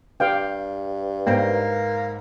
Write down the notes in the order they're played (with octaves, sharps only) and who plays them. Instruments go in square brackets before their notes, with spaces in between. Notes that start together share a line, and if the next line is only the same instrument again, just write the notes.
[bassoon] G2 [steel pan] G4 F5 G5
[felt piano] G#2 B4 C5 [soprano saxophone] A#3 [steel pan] G5